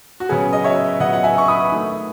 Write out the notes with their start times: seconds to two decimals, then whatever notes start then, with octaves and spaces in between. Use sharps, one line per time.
0.20 F#4
0.29 C#3 F#3 B3 G#4
0.53 D#5
0.64 C#5 E5
1.00 C#3 F#3 B3 D#5 F#5
1.13 F#5
1.24 E5 G#5
1.38 C#6
1.48 B5 D#6
1.72 D#3 A3